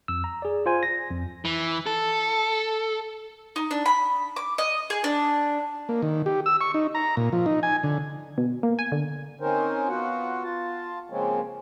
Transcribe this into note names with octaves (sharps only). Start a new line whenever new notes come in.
F2 E6
A#5
G#4 D5
F4 C5 G#5
A#6
F2
E3
A4
D#4
D4
B5
D6
D#5
G#4
D4
A#3
D#3
G4
E6
C#6
D#4
A#5
A#2
F3
D#4
G#5
D3
B2
A#3
G#5
D3
C4 C#4 D#4 A#4 C5
B3 F4 F#4 F#5
F4 A5
C#3 F3 G#3 A#3 C4 C#4